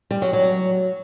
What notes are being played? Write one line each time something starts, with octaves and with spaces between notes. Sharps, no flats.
G3
F#3
F#3